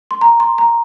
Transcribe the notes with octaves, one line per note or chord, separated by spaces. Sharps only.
C6
A#5
C6
A#5